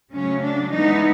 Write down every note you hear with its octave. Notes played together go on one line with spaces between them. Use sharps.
C#3 F#3 A3 C#4
D4
E3 G#3 B3 D#4